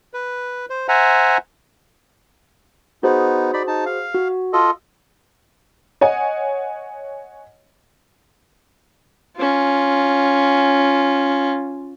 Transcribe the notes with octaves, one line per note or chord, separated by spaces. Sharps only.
B4
C5
C5 E5 F#5 G#5 A#5
B3 D#4 F#4 G#4 C5
D#4 D5 B5
D#4 A5
F5
F#4
F4 A4 D#5
C#5 D#5 F#5 G#5
C#4 F4